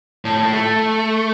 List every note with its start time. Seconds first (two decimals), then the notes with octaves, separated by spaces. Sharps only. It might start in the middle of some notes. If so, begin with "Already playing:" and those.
0.25 A2
0.53 A3